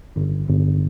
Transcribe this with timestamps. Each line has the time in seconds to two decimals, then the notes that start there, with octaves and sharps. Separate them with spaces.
0.16 G1
0.49 G1